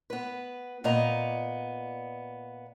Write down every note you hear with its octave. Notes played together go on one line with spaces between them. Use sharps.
B3 B4
A#2 B3 D#5 A#5